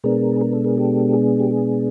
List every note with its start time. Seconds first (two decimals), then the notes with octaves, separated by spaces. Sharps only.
0.04 B2 G#3 B3 D4 G#4 A#4
0.41 A#4
0.53 A4
0.65 G#4 A#4
0.77 G4 A4
1.14 G#4
1.40 G4
1.51 G#4